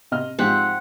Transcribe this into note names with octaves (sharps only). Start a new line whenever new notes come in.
C3 D#5 F6
G#2 F3 C4 G4 F#5